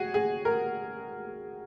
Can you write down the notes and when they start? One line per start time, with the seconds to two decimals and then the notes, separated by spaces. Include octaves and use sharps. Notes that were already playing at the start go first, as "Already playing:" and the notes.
Already playing: F#4 G#4
0.14 G#4
0.45 A#4